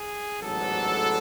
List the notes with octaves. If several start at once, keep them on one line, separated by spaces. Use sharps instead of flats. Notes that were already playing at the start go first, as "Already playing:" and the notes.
Already playing: G#4
A1 G#2 F#3 B3 D4 A4